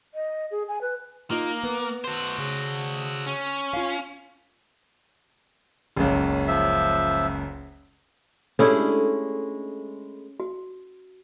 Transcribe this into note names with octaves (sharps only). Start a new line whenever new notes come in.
D#5
G#4
G#5
B4
A#3 D#4 F4 D#5
B3
F#4 C5
C#3
C#4
F4 F5
F#1 C#2
F3 E5
G#3 A3 C#4 D4 E4 G4 A4
F#4